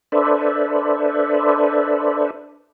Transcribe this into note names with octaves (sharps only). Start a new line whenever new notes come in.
D4 A4 B4 C5 D5 E5